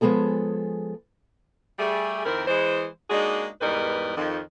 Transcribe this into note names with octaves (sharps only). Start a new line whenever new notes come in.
F3 G#3 B3 G#4 A4
G3 A3 G#4
F2 D#3 C4 E4 A#4
E3 G#3 C5
G#3 A#3 D4 D#4 F#4 G#4
E2 G#2 G3 D#4 A#4 B4
F2 D#3